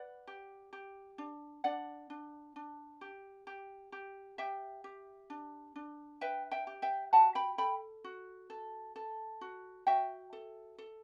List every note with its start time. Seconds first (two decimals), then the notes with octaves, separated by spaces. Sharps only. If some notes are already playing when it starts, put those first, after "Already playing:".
Already playing: B4 D5 F#5
0.27 G4
0.73 G4
1.18 D4
1.64 D4 D5 F#5
2.10 D4
2.56 D4
3.01 G4
3.47 G4
3.92 G4
4.38 G4 E5 G5
4.84 G4
5.30 D4
5.76 D4
6.21 B4 E5 G5
6.51 E5 G5
6.67 G4
6.82 E5 G5
7.13 F#4 F#5 A5
7.35 G5 B5
7.58 A4 G5 B5
8.04 F#4
8.50 A4
8.96 A4
9.41 F#4
9.87 F#4 E5 G5
10.33 A4
10.78 A4